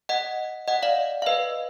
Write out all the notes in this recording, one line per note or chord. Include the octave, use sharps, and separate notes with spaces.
D#5 F#5
D#5 F#5
D5 F5
F5
B4 D#5